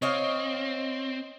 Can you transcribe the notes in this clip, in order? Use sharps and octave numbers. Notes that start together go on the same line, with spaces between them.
C4 C#5 D#5 F5